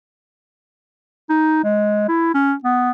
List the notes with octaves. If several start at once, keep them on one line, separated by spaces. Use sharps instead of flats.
D#4
G#3
E4
C#4
B3